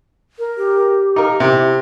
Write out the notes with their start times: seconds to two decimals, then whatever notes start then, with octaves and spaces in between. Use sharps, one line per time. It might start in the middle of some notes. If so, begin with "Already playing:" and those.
0.39 A#4
0.57 G4
1.16 D#4 A#4 F5
1.40 C3 E4